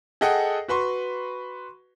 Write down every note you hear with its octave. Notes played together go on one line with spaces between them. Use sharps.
G#4 A4 D#5 F#5 G5 D#6
F#4 B4 C6 C#6